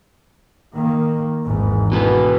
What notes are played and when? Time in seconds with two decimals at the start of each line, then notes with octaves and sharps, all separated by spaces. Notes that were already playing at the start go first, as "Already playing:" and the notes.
0.73 D#3 A#3
1.44 G#1 E2 G#2
1.92 B2 E3 B3